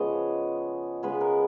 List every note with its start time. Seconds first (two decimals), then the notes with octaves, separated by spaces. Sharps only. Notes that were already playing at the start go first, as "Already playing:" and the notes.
Already playing: C#3 F3 G#3 B3 C#5 D#5
1.03 C#3 G#3 B3 B4
1.21 A#4